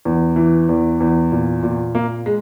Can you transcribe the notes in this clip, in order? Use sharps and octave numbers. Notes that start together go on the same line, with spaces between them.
E2
E3
E2
E2
A#2
A#2
A#2 A#3
G#3